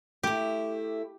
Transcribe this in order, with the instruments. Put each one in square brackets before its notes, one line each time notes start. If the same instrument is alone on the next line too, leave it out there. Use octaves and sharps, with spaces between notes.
[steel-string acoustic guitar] A3 E4 [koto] G4